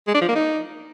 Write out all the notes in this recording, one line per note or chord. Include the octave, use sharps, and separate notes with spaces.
G#3
D4
F3
A#3
D#4